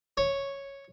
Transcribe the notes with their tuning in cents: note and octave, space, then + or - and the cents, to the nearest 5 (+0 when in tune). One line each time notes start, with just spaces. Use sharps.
C#5 -5